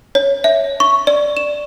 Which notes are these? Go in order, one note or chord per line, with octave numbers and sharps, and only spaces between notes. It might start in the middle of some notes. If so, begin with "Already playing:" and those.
C#5
E5
C#6
D5
E7